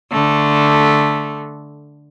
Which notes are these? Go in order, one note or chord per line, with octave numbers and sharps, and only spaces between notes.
D3 A3